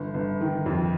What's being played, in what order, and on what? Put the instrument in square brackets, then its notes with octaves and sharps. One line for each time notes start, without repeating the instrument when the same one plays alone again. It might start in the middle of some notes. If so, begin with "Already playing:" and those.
Already playing: [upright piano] G1
G1
D#3
F2